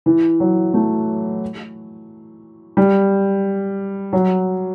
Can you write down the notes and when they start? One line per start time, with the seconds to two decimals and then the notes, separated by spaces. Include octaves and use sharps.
0.06 E3
0.40 F#3
0.74 A3
2.77 G3
4.13 F#3